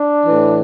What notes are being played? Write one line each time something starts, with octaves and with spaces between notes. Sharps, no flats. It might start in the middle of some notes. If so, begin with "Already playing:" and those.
Already playing: D4
A2 E3